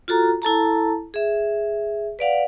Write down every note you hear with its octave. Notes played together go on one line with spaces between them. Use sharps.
F4 F#4 A4 A#5
E4 A4 A5 A#5
G#4 E5
B4 D5 F5 F#5